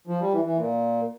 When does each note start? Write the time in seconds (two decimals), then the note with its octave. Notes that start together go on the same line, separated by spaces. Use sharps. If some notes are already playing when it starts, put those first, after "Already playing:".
0.07 F3
0.20 G3
0.32 E3
0.44 E3
0.56 A#2